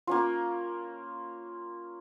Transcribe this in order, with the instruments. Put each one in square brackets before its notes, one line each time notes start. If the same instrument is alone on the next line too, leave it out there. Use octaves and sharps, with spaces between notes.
[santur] A#3 C#4 F4